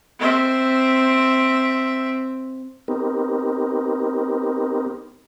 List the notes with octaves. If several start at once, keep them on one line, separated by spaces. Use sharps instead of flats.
C4 E5
B3 C4 D#4 G4 A#4